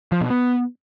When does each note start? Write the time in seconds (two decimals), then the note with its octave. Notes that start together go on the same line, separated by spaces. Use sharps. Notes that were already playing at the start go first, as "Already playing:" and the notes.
0.12 F3
0.21 B2
0.30 B3